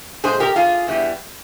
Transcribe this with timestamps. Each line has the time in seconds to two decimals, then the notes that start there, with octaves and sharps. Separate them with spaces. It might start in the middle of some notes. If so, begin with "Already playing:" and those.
0.24 A#2 G#3 G#4 C5
0.40 G4 A#4
0.56 F4 G#4
0.87 E2 E3 G3